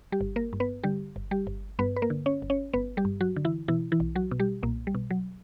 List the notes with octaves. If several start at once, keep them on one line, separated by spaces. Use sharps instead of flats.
G3 G4
G1
A#3 A#4
G2
B3 B4
D3 G3 G4
G1
G3 G4
G1
G2 B3 B4
B4
A#3 A#4
D3
C#4 C#5
G1
C#4 C#5
G1 B3 B4
G3 G4
G2
F#3 F#4
D3
E3 E4
B2 E3 E4
E3 E4
B1
F#3 F#4
B2
G3 G4
B1 A#2 A#3
G3
B2
F#3